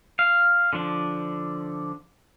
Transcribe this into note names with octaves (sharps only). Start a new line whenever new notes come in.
F5
D3 F3 D4